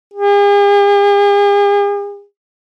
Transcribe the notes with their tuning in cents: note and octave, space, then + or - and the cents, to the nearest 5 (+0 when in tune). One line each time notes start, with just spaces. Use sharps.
G#4 -45